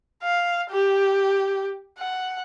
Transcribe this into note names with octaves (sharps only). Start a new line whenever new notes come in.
F5
G4
F#5